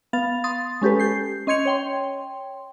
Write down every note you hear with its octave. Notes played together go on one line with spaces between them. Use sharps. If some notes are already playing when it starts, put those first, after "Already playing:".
B3 F5 A6
C6 D#6 A6
G#3 C#4 G4 A4 B4
G6 C7
C#4 D#5 C6 G#6 C#7 F7
C#5 G5 C6